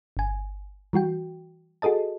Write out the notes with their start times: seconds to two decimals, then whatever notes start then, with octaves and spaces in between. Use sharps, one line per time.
0.17 G1 G#5
0.93 E3 G3 F#4 G5
1.82 F#4 G#4 A4 D#5 A5